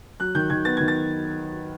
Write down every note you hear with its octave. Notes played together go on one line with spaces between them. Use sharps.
F#3 F#6
D#3 G6
D#3 G#6
B3 A6
D#3 G#6
A6